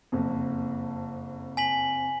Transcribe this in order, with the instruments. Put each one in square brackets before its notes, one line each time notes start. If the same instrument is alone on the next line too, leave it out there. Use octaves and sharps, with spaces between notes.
[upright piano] F#1 F2
[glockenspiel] G#5 B6 F#7